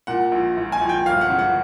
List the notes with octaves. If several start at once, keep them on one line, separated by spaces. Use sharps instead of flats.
A#2 F#5
A#1
A#1
G#5
A#1
G5
G1 F5
F#5
C#3
F#5